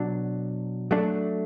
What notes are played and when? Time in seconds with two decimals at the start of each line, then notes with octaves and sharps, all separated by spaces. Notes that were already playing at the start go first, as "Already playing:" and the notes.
Already playing: B2 F#3 D4
0.91 F#3 A3 D4